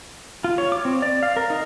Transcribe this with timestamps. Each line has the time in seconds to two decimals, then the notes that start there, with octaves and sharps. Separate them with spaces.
0.44 F4
0.58 C#5
0.72 D6
0.85 C4
1.02 D5
1.23 F5
1.36 A#4
1.50 D#4